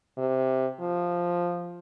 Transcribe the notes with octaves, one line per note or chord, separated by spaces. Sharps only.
C3
F3